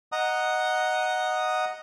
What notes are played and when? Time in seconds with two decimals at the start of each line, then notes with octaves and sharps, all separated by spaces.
0.12 D#5 F#5 A#5 D#6